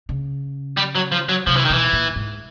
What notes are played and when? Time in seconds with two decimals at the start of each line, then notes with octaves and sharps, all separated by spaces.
0.09 C#3
0.77 G3
0.95 F#3
1.12 F3
1.29 F#3
1.47 C3 F3
1.56 E3
1.65 D#3
1.70 B2 E3
1.93 A#2
2.16 G#2